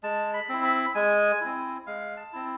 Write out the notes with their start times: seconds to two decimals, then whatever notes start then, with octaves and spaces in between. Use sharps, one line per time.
0.03 G#3 A5
0.34 B5
0.49 C4 E4
0.64 B5
0.95 G#3 G#5
1.41 C4 E4
1.87 G#3 F5
2.17 A5
2.33 C4 E4